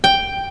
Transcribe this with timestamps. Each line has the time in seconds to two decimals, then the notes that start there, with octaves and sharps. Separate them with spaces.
0.04 G5